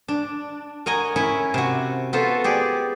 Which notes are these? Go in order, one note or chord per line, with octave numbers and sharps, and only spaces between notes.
D4
A#4 C#5 D#5 F#5 G#5 A#5
C#4 E4 A#4 C#5
C3 F#4
B3 F4 F#4 A4 C5
G4 G#4 D5